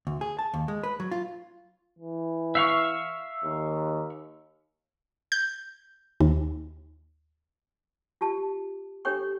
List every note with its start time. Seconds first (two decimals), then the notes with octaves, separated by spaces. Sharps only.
0.07 D2
0.21 G#4
0.39 A5
0.54 D#2
0.68 G#3
0.83 B4
1.00 F#3
1.11 F4
1.99 E3
2.55 E5 F5 C#6
3.44 D#2
5.32 G6
6.20 D#2
8.21 F4 G4 A5
9.05 D4 G4 A4 C#5 G5 C#6